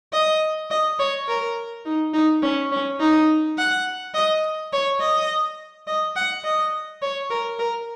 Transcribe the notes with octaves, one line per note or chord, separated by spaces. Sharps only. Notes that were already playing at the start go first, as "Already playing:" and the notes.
D#5
D#5
C#5
A#4
D#4
D#4
C#4
C#4
D#4
F#5
D#5
C#5
D#5
D#5
F#5
D#5
C#5
A#4
A#4